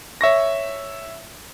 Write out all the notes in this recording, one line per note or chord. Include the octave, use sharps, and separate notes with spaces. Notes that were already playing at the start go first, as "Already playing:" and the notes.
C#5 E5 C#6 A#6